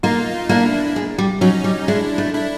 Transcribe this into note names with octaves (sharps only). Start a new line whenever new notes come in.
A#3 D#4 F4
A#3 D4 E4
G#3
G3
F#3 C#4 D#4
G3
G#3 D4 E4
A3
D4 E4